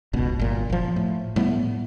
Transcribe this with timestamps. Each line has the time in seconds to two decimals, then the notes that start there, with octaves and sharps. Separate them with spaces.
0.13 D#1 G#1 C#2 B2
0.39 G1 A#2
0.70 F#1 F3
0.96 A2
1.36 A2 G3 A3 B3